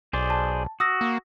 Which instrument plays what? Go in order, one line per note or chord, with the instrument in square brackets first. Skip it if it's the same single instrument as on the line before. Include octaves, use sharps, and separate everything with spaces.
[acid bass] B1 [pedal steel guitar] G#4 C5 D5
[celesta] A5
[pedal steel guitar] F#4 [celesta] D#6 E6 A#6
[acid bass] A#3